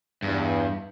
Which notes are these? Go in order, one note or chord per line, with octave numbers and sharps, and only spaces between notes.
E2 G2